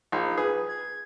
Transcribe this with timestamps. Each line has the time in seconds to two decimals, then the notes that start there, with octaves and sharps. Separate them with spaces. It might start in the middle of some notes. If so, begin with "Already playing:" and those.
0.12 A#1 D#4
0.38 G#4 B4
0.69 G#6